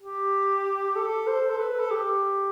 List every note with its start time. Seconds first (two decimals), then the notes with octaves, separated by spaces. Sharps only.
0.02 G4
0.95 A4
1.27 C5
1.50 A4
1.58 B4
1.80 A4
1.91 G4